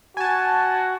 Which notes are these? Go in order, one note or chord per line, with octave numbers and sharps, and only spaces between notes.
F#4 G#5 A5